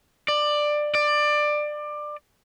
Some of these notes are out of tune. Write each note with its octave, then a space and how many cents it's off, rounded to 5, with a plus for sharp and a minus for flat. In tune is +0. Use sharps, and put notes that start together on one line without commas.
D5 +15
D5 +20